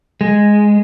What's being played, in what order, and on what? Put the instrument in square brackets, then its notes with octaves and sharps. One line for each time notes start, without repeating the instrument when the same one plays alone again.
[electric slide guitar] G#3